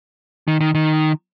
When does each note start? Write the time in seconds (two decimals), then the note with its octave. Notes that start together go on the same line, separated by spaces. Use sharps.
0.48 D#3
0.60 D#3
0.75 D#3